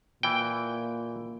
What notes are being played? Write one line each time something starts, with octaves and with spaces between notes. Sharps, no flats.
A#2 E3 G5